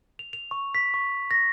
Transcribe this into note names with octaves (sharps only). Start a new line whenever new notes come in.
F7
F7
C#6
B6
C#6
A#6